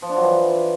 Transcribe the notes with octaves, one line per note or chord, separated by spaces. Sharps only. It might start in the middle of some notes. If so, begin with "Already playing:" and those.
F3
D4
F#3
E3